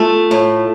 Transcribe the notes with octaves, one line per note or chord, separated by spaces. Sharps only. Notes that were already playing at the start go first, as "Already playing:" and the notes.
Already playing: A3 F4
A2